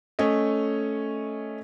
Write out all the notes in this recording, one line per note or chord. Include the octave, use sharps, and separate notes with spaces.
A3 C#4 C#5 D#5